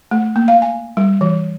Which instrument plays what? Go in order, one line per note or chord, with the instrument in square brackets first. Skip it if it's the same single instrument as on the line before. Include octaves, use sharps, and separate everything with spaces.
[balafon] A3
A#3
F5
G#5
G3
E3